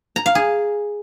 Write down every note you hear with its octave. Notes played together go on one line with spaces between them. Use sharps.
A#5
F5
G#4